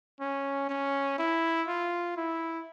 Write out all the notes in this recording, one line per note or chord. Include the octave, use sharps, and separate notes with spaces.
C#4
C#4
E4
F4
E4